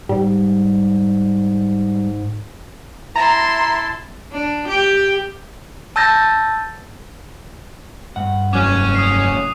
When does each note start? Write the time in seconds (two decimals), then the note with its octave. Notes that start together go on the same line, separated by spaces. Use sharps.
0.09 G#2 G3
3.16 E4 E5 A5 A#5 C6
4.32 D4
4.68 G4
5.96 A5 E6 G6 A6 A#6
8.16 G2 F#5
8.53 F1 F#3 C#4 D6 F#6 D#7
8.95 D#6 C7